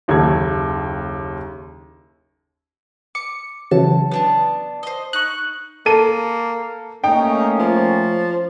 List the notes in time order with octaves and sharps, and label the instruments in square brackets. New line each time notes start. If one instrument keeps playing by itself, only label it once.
[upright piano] F#1 D#2 G4 A4 G#6
[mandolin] D6 [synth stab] C#7
[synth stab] C#3 E3 F#3 [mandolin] A5
[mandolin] B3 D4 A5
C5 D#5
[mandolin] D#4 [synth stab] C#6 F#6
[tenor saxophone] A#3 [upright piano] A4 D#7
[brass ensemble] A3 A#3 C#4 [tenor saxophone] D#4 [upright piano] G5
[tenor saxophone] F3